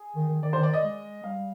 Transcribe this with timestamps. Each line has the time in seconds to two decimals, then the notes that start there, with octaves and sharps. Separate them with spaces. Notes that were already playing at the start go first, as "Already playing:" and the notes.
Already playing: G#4
0.16 D#3
0.29 D#3
0.42 D#3 D5
0.53 D#3 C5
0.63 D5
0.73 D#5
0.83 G#3
1.23 G3 F5